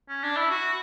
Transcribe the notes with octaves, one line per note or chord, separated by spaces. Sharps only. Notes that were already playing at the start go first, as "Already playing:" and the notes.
C#4
D4
E4
F#4